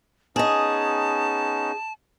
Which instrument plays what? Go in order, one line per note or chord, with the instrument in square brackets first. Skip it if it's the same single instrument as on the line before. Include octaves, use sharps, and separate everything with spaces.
[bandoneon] B3 C#4 D#4 [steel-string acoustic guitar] G#4 D#5 [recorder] A5